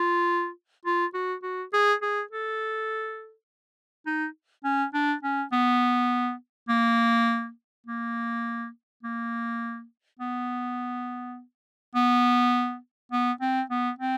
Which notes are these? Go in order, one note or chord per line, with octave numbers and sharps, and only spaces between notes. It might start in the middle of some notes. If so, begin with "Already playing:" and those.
Already playing: F4
F4
F#4
F#4
G#4
G#4
A4
D#4
C#4
D4
C#4
B3
A#3
A#3
A#3
B3
B3
B3
C4
B3
C4